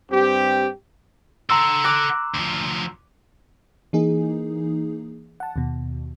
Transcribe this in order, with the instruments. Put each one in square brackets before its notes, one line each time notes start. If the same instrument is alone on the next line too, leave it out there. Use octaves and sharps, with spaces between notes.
[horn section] G2 C4 G4
[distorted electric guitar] A4 F#5 [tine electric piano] A#5 C6 E6
[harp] D6 F#6 A#6
[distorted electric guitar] D2 F3
[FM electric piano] E3 A#3 D#4 G#4
F#5 A5
D#2 B2